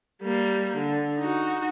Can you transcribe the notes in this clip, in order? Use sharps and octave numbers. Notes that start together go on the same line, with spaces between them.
G3 A#3
D3
D#4 F#4